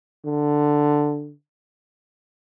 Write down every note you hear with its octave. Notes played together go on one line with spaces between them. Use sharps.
D3